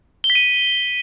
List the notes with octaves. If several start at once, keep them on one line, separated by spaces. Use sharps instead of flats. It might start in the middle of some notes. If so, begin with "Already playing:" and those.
G7
B6
D#7